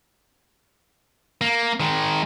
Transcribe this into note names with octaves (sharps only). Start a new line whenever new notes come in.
A#3
D#3 G#3